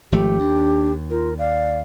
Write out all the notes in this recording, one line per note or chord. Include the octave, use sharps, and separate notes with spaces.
G#1 F3 A3 G4
D#2 D4
F4 A#4
D5 F5